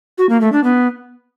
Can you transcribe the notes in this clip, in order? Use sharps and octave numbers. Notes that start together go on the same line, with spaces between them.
F#4
A#3
A3
D4
B3